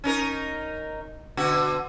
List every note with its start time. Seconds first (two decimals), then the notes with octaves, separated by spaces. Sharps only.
0.04 C#4 D#4 A#4
1.37 B2 D3 F#4